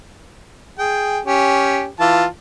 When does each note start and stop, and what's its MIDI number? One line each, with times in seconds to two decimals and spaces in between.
0.79 1.20 68
0.79 1.20 79
1.25 1.86 61
1.25 1.86 67
2.00 2.25 52
2.00 2.25 65
2.00 2.25 81